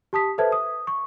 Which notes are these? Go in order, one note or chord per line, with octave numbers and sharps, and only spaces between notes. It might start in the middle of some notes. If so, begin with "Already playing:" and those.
G4 A5 D#6 B6
A4 B4 C5 E5 A5 G#6
D#6
C#6